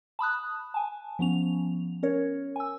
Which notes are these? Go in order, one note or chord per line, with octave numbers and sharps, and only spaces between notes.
A5 B5 D#6 F#6
G#5 A5
F3 B3 C#4 F7
C#4 A#4 C#5
G#5 E6